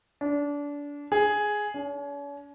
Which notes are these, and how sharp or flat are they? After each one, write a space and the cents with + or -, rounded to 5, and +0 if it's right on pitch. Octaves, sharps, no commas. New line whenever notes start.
D4 -25
G#4 +5
C#4 +45